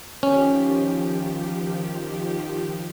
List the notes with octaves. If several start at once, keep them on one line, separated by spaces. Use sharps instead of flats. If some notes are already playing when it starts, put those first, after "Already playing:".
D#3 F3 C#4 G4